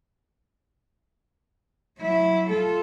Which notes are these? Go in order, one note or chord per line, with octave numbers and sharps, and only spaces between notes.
F#3 E4
F4 A4